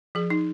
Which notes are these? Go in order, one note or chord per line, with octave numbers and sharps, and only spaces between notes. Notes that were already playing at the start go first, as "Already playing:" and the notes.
F3 G#4
D#4